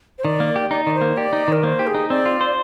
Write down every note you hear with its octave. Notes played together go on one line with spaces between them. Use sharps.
C5
D#3 D5
A#3
G4
D#4 D5
D#3 D5
C5
A#3
G4 D5
D#4
D#3 A#4
A#3 C5
G4
G#4
D#4
C4 D5
F4
C5